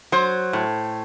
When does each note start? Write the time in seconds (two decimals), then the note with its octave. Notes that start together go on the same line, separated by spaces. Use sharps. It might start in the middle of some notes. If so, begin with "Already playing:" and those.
0.12 F#3 C5
0.53 A2